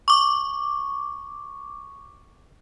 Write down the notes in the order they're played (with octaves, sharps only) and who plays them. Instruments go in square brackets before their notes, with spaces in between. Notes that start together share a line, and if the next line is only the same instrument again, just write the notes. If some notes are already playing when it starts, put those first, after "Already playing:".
[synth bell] C#6 D6